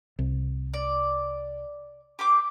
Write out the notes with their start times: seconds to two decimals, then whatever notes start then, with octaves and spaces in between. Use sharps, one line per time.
0.19 C2
0.74 D5
2.19 G4 C5 D6